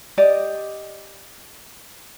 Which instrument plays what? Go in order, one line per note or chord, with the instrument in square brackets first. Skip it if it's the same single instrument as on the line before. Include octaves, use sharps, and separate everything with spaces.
[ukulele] G4 D5 D#5